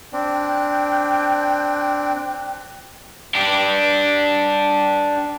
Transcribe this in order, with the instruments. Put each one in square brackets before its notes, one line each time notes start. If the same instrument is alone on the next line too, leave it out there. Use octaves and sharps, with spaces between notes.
[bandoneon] C4 D4
[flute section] G5 F#6
[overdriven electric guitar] D4 G4